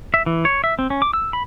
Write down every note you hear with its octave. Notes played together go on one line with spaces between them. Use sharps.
E5
E3
C#5
E5
C4
C#4
D6
E6
B5